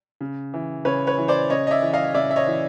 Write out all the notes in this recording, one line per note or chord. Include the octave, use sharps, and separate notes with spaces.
C#3
E3
C#3 B4 C#5
B4 C#5
E3
C5 D5
C#3 C#5 D#5
D#5
D5 E5
E3
D#5 F5
C#3 D5 E5
E5
C#5 D#5
E3